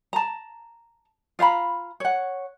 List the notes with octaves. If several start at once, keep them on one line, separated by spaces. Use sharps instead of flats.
A5 A#5
F4 F5 A#5 B5
C#5 F#5